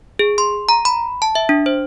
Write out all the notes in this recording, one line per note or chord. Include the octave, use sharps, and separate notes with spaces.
G#4
C6
A#5
B5
A5
E5
D4
C5